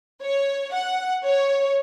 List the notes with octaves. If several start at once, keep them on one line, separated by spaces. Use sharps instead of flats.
C#5
F#5
C#5